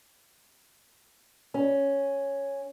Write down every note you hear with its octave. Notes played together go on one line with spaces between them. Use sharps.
C#4